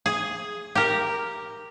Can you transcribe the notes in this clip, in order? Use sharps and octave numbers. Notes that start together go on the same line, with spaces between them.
G#4
G4 A#4